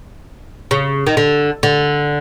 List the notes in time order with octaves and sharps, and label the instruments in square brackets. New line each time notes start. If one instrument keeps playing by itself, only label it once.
[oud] C#3
D#3
D3
D3